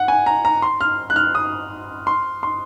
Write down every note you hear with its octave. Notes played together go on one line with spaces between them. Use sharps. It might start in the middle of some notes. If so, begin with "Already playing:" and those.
Already playing: F#5
G#5
A#5
A#5
C6
F6
F#6
F6
D#6
C6
C6